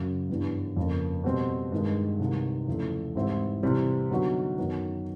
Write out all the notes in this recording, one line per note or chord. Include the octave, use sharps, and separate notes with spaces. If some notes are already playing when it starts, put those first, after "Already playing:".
Already playing: F#2 C#3 F#3
G2 E3 G3 B3 D4
F2 C#3 F3 A#3
B2 G3 C4
G2 D#3 G#3
C2 C3 D#3
E2 C#3 F3 A3
G#2 E3 G3 C4 E4
C3 E3 G3 C4
D3 F#3 B3 D#4 F#4
F#2 D#3 F#3 B3